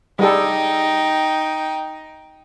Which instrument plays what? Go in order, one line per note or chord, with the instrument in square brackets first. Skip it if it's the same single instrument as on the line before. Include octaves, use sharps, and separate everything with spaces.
[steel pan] G3 G#4 A4 [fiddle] D#4 G5